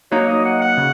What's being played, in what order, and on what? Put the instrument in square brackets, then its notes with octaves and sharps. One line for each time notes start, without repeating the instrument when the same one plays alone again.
[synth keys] F#3 A#3 D#4 [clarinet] C#5
[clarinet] D#5
F#5
F#5
[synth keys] C#3